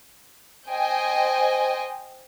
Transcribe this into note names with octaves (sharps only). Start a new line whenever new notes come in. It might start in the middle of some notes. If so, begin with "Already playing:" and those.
C5 D#5 G5 G#5